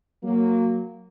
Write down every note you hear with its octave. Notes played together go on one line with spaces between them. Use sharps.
F#3 A#3